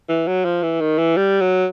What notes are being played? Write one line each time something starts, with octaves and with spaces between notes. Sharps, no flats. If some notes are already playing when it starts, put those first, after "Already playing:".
E3
F#3
F3
E3
D#3
E3
G3
F#3